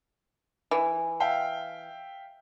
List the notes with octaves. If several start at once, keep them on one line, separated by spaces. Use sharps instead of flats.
E3
E5 F5 G5